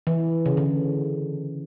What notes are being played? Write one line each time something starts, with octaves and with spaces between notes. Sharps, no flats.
E3
C#3
D3